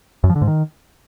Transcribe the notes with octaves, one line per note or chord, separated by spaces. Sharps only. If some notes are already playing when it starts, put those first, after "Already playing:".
F#2
F3
D3
G#2
D#3